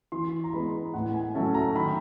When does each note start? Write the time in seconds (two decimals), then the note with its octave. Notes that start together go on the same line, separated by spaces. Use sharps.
0.12 E3 C6
0.44 A#5
0.53 G#3 B3 B5
0.94 A2 F#5
1.14 G#5
1.35 F#3 A3 C#4 A5
1.54 A#5
1.75 D#3 B5